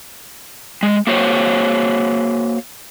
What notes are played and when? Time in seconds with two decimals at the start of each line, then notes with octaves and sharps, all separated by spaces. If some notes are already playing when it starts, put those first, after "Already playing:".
0.83 G#3
1.07 A#3 F#4 C5 C#5